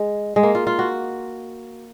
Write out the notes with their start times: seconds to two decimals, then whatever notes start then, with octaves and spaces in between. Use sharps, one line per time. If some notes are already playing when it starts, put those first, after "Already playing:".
Already playing: G#3
0.36 G#3
0.43 A#3
0.55 F4
0.67 F4
0.79 F#4